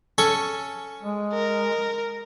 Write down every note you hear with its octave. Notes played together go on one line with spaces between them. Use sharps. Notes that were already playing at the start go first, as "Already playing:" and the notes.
C#4 A4 C#6
G#3
A#4